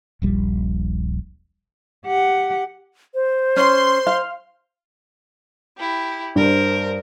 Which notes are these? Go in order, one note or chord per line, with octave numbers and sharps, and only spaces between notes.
D#1 A#1 G3
G4 F#5
C5
C#4 C6
F5
E4 G4
G2 A#4 C5